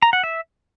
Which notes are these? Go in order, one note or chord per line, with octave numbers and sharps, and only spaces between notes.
A#5
F#5
E5